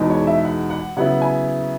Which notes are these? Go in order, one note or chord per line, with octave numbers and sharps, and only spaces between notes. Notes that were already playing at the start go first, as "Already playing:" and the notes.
Already playing: E2 B2 G#3 D#4
C#5
E5
F#5
F#5
C#3 F#3 B3 E4 F#5
G#5